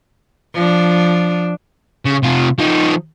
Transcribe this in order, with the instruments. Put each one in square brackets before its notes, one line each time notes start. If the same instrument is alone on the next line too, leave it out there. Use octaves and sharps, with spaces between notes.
[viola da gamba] F3 D4
[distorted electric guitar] C#3
C3 F4
F3 D#4